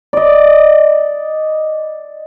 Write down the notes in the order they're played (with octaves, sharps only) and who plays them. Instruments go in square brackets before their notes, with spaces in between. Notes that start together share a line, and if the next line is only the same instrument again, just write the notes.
[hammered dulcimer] D5 D#5